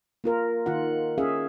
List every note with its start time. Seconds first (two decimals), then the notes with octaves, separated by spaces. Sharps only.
0.24 A#3 F4 A#4
0.66 D#3 F4 F#5
1.18 C#4 G#4 E5 F5